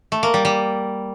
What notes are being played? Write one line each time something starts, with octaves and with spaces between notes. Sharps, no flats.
A3
A#3
G3
G3